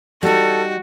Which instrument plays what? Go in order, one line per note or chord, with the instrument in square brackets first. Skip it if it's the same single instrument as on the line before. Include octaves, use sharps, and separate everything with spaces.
[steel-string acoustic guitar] G3 D#4 [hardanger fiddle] F#4 [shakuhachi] A4